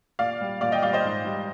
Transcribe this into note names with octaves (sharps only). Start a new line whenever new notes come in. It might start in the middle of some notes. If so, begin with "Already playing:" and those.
A#2 D5 F5
G3
A#2 D5 F5
D#5 G5
G3 D5 F5
C5 D#5
G#2
G3